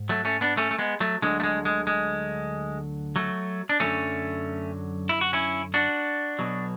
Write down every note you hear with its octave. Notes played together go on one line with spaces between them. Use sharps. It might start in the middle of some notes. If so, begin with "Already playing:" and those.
Already playing: G#2
F#3 A3
A3 C#4
B3 D4
A3 C#4
A3
G#3 B3
F#3 A3
D2 D3 F#3 G#3
A3
G#3
G#3
G#3
F#3 A3
D4
F#2 D3 F#3 A3 C#4
E4
F#4
C#4 E4
D4 F#4
B1 B2 F#3